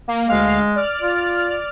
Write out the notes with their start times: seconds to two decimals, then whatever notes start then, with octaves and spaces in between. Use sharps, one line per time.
0.08 A#3
0.29 D2 G#3 F5
0.76 D5 F6
1.01 F4